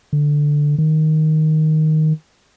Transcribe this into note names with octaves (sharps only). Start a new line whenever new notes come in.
D3
D#3